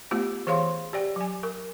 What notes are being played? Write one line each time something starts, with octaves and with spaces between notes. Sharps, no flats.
A3 B3 F4 G4
E3 G#4 C#5 F5 C6
G4 D5 G5
F#3 G#5
A#4